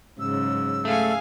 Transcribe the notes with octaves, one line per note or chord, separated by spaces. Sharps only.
G#2 C#3 F#3 E6
A3 G#4 F5 G#5